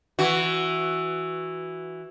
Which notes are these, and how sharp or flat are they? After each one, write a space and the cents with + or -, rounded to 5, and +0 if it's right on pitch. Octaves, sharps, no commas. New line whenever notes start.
E3 +0 F#4 +0